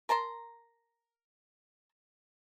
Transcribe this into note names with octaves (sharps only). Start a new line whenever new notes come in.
A#4 A5 A#5 C6